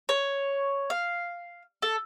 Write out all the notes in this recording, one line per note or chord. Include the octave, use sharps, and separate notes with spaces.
C#5
F5
A4